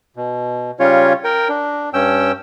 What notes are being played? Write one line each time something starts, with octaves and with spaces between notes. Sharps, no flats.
B2
C#3 G3 C#4 F4 C#5
A#4 G5
D4
G2 C#4 G5 E6